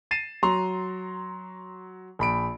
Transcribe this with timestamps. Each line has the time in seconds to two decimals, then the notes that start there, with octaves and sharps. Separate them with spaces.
0.11 A6 C7 D#7 E7
0.43 F#3 A#5 C6 F7
2.19 A#1 B5 D7